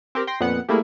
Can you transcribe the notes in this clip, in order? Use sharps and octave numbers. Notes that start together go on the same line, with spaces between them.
C4 G4 A#4
G5 C6 A#6
F2 A#2 B3 F#5 C#7
G3 A3 A#3 E4 G#4